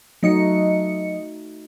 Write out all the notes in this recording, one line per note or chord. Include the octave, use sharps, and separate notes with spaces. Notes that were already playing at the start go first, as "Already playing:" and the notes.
F#3 A3 D#4 F#4 D#5 C#7